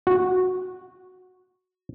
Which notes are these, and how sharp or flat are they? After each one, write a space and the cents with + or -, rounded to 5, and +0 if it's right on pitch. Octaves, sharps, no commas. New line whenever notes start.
F#4 -10